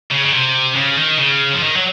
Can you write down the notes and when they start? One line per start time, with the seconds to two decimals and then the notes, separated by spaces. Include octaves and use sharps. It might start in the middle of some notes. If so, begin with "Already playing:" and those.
0.11 C#3
0.25 C#3
0.33 C3
0.76 C#3
0.97 D#3
1.19 C#3
1.53 F3
1.63 D#3
1.76 F#3